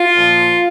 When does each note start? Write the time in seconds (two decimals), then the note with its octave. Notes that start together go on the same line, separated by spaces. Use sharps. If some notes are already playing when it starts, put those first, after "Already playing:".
Already playing: F4
0.16 A#2 F3